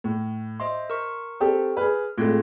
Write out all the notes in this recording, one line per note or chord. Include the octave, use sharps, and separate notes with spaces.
A2
C5 D#5 E5 C6
A#4 C#6
C4 G4 A4
G#4 B4 F6
A2 G#3 A3 C4 F4 G#6